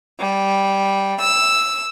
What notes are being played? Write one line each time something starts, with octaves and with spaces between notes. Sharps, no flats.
G3
E6